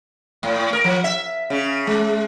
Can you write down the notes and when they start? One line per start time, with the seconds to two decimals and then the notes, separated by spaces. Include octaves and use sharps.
0.43 A2
0.73 A#4
0.84 F3
1.04 E5
1.50 C#3
1.87 G#3